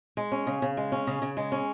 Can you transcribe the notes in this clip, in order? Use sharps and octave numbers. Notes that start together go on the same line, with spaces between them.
G#3
C#4
C#3
C#3
G#3
C#4
C#3
C#3
G#3
C#4